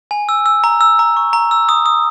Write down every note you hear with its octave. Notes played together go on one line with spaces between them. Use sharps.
G#5
E6
E6
A#5
E6
A#5
C#6
A#5
E6
D#6
D#6